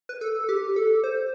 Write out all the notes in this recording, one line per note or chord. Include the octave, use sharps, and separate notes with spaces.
B4
A4
G4
A4
C5